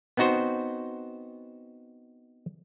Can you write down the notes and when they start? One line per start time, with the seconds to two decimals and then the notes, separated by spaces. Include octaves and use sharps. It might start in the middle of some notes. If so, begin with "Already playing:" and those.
0.17 B3 C4 D#4 F#4 C5